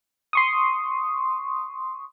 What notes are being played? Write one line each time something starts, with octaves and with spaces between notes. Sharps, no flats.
C6 C#6 D#6